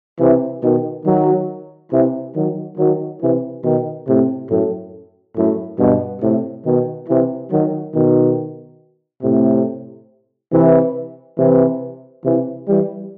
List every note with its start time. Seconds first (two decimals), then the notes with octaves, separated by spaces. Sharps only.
0.20 C3 E3
0.63 B2 D#3
1.06 D#3 F#3
1.92 C3 E3
2.35 D#3 F#3
2.78 D#3 F#3
3.21 C3 E3
3.64 B2 D#3
4.07 A2 C3
4.50 F#2 A2
5.36 F#2 A2
5.79 G2 B2
6.22 A2 C3
6.65 B2 D#3
7.09 C3 E3
7.51 D#3 F#3
7.94 B2 D#3
9.23 A2 C3
10.52 C3 E3
11.39 C3 E3
12.24 C3 E3
12.68 E3 G3